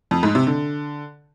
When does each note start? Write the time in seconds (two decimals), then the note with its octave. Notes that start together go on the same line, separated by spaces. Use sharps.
0.11 F2
0.23 G#2
0.35 C3
0.47 D3